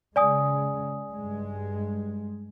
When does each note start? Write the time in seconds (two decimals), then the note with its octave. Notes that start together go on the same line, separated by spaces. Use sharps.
0.16 C#3 G#3 D5 G#5 D#6
1.12 G2 G#3